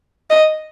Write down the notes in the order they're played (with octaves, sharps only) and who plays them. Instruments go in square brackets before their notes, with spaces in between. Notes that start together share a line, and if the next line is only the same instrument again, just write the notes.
[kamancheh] D#5